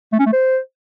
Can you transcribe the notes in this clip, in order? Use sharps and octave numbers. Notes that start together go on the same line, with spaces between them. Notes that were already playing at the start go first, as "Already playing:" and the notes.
A3
C#4
A3
C5